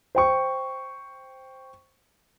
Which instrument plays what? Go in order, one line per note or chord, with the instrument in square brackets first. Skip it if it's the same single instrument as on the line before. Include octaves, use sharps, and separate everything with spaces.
[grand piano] C5 G5 C#6